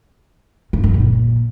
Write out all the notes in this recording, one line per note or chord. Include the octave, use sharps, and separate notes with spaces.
G2
F#2
A#2